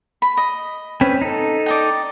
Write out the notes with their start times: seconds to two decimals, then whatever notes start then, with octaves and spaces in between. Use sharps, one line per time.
0.22 B5
0.37 D#5
1.01 C4 C#4 B4
1.22 D#4 A4
1.66 D5 D#5 G5